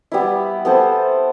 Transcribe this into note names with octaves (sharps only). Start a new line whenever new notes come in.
G3 B3 E4
B3 E4 A4 C5